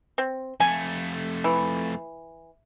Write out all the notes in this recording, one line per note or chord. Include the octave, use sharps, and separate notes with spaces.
C4
F2 A3 G#5
E3